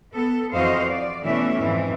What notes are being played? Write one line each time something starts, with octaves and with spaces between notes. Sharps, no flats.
B3 A4
F2 E3 F#4 C5 D#5 F5
D5
B2 E3 A3 C#4 D5 E5
F2 G#2 E3